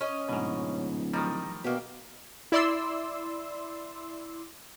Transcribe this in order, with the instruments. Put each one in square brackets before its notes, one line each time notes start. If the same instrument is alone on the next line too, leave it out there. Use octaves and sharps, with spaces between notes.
[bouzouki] C#4 D#5
[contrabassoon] D1 [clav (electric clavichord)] G#2 B2
[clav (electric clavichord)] D#3 F3 G3 [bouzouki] D#4
[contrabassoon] B2 [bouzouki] A#3 D4 G4
[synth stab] E4 D5 C6 E6